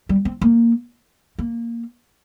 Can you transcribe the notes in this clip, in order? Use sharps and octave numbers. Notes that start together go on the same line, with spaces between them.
G3
C4
A#3
A#3